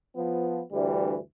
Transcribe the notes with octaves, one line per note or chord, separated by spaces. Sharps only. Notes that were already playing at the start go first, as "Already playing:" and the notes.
F3 B3
D2 G2 E3 G3